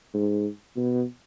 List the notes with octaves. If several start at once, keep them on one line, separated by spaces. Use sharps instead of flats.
G#2
B2